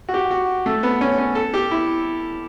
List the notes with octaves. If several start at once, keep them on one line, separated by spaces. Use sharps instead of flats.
F#4
G4
F#4
A3
B3
C#4
C#4
A4
G4
E4